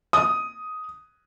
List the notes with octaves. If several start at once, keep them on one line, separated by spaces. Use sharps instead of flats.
D#6